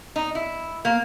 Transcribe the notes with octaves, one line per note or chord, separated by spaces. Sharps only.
D#4
E4
A#3